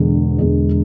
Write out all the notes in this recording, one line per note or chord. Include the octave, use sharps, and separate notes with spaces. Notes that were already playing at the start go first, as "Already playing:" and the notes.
Already playing: E1 E2 D3 G#3
E1 E2 D3 G#3